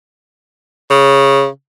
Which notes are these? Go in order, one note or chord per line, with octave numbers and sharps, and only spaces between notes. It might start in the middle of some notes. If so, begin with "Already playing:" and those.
C#3